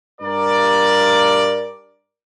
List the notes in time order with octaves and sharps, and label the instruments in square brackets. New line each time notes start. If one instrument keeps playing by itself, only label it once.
[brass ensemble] G2 A#4 D5